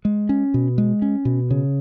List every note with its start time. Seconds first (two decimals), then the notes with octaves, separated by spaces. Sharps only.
0.05 G#3
0.29 C#4
0.54 B2
0.78 G#3
1.02 C#4
1.25 B2
1.51 C#3